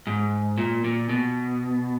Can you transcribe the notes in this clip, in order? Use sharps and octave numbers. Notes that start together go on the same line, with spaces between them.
G#2
A#2
A#2
B2